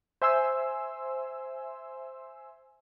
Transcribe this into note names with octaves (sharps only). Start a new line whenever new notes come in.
C5 E5 G#5 C6 E6